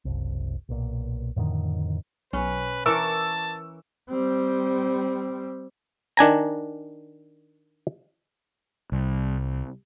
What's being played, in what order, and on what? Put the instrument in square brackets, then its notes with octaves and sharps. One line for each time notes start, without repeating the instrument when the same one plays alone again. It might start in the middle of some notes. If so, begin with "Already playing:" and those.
[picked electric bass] F#1 C2
B1 A#2
F2 A2 D3 D#3
[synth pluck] B1 [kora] C#4 [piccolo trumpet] B4
[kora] E3 [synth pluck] A#4 C#6 D6 [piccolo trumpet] A5 [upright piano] E6
[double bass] G3 C4
[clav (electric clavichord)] D#3 D4 G#5 A#5
[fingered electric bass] C2